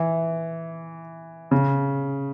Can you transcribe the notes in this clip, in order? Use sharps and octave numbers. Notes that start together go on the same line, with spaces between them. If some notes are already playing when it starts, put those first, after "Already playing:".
Already playing: E3
C#3